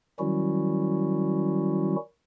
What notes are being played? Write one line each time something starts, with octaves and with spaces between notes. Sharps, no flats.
D#3 F#3 G3 C#4 E4 F#4